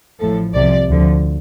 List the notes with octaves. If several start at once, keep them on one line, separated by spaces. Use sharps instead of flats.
A1 A2 F3 A4
C2 C3 F3 D5
D2 D3 F3